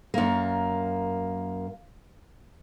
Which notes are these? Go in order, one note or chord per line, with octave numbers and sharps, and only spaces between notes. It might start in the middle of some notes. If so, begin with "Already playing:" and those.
F#2 A#3